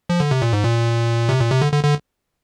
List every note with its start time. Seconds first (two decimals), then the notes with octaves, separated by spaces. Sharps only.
0.10 F3
0.20 D3
0.31 C3
0.42 A#2
0.53 G#2
0.64 A#2
1.29 C3
1.40 A#2
1.50 C3
1.62 D3
1.72 D3
1.84 D3